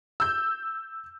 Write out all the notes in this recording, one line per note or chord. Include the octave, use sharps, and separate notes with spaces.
E6 G6